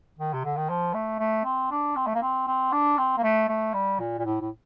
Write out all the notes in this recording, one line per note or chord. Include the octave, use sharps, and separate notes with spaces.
D#3
C3
D3
D#3
F3
A3
A3
C4
D4
C4
A3
A#3
C4
C4
D4
C4
A#3
A3
A3
G3
A#2
A#2
A2
A2